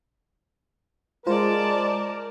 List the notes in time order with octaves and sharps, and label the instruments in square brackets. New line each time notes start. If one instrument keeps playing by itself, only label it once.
[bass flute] G#3 [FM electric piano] F4 C5 [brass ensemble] A#4 [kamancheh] D5 A5